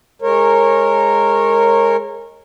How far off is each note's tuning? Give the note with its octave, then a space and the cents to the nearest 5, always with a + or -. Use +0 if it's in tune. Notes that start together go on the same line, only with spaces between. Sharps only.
G#3 +0 A#4 -10 C#5 -25